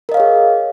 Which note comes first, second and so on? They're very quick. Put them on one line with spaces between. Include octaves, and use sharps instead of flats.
A#4 D#5 F5 C#5 G#4